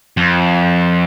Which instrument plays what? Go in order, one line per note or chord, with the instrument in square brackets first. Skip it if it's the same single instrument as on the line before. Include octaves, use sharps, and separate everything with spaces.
[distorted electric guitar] F2